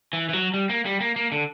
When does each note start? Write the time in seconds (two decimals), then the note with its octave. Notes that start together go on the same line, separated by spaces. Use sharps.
0.13 E3
0.29 E3
0.33 F#3
0.54 G3
0.69 A#3
0.85 G3
1.00 A#3
1.16 A#3
1.32 D3